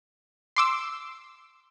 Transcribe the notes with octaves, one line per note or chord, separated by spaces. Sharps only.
C6 D6 E6